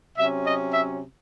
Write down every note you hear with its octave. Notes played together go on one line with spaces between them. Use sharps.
C3 F#3 C#4 E5
D#5
E5